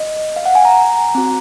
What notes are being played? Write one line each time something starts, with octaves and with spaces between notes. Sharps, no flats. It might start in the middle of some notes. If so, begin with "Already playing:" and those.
Already playing: D#5
F5
F#5
G#5
A#5
C4 F#4